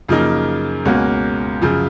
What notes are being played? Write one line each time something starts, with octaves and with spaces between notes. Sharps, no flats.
F#2 C#3 F3 A#3 D#4
C#2 B2 A#3 C#4 F#4
F#2 C#3 F3